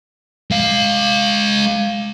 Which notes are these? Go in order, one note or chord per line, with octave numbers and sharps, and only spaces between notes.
G#3 F5